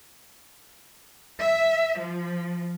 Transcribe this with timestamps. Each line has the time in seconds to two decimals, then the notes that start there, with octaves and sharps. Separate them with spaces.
1.39 E5
1.98 F3